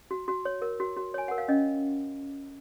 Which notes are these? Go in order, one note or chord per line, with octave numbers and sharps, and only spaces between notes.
F#4
F#4
C#5
A#4
F#4
F#4
C#5 G#5
A#4 F#5
F5
C#4 D#5